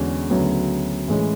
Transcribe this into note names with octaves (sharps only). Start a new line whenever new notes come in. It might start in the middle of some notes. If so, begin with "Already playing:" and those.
Already playing: E2 D3 G#3 C#4 F#4
D2 C#3 F#3 B3
A2 E3 G#3 C#4 E4